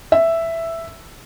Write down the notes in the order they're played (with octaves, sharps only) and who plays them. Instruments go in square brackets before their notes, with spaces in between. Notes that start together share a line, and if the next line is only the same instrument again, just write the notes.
[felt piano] E5